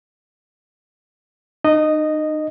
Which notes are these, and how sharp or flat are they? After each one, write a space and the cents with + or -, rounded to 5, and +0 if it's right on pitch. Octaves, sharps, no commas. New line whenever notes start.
D#4 -35 D#5 -10